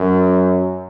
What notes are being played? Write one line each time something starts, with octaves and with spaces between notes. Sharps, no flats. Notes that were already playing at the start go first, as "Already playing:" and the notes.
Already playing: F#2